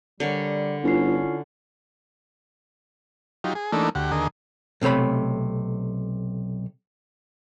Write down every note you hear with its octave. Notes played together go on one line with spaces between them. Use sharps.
D3 G3 A#4 C#5
G1 C#4 E4 F4 C7
F#3 D#4 F4 G4
G#4
E3 A3 A#3 D4 D#4 A4
D2 G4 F#5
D#2 D3 G#4 A#4 D#5
B1 C3 A3 C#5 B5